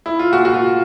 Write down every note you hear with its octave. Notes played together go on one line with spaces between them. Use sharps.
E4
F4
A#2 F#4
F#4
F4